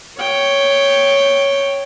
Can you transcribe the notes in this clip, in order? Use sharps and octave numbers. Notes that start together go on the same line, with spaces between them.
C#5 G5